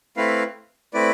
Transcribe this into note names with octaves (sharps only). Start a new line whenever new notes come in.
A3 C4 E4 B4 F5
A3 C4 E4 B4 D5